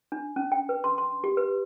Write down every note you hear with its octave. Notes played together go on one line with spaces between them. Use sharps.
D4
C#4
G5
B4
C6
C6
G4
B4